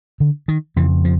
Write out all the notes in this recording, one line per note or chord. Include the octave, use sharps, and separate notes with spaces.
D3
D#3
F2 C#3 E3
F3